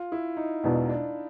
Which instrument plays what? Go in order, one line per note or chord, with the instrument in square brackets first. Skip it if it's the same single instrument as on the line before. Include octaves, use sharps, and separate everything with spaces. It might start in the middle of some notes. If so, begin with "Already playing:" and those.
Already playing: [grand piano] F4
E4
D#4
[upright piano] E1 E2 B2 [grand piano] D4
[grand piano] D4